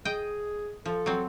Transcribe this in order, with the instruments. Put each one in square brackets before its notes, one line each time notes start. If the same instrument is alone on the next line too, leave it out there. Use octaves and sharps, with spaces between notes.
[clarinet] G#4 [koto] D#5 G5
[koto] F3 [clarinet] A4
[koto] F#3 C4